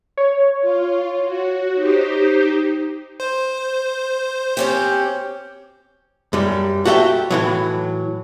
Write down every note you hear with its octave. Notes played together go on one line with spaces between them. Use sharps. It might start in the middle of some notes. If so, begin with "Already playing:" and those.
C#5
F4
F#4
D#4 G4 C5
C5
C4 C#4 G4
F#2 G3
F#4 G4 A4 D#5 E5 G5
A2 E3 F#3